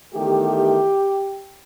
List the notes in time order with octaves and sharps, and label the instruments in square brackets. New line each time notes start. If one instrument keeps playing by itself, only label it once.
[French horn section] E2 D#3 A3 G4